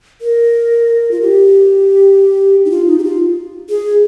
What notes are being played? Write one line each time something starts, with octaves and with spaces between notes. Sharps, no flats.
A#4
F4
G4
D#4
F4
D#4
G4
F4
G#4